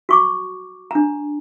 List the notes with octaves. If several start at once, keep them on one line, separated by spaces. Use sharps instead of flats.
F#4 C#6 D6
D4 A#5